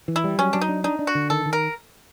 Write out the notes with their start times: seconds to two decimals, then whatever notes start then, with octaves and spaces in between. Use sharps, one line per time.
0.08 E3
0.16 E4
0.24 G3
0.38 F#3 C#4
0.53 F#3 D4
0.61 D#4
0.69 D4
0.84 D4 D#4
0.99 D4
1.07 F#4
1.15 D3
1.30 D#3 A4
1.46 D#3
1.53 A#4